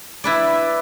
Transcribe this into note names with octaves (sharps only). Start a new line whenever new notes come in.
E4 B4 D5